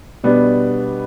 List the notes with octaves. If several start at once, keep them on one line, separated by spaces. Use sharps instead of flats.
B2 G3 B3 D4